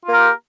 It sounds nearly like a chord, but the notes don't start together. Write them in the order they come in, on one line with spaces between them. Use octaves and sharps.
F4 A#3 A#4 G4